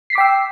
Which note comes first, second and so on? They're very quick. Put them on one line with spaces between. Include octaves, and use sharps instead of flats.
C7 B6 D6 G5 E6